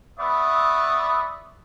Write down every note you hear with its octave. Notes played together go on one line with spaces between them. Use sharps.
B3 B4 D5 E5 C#6 D#6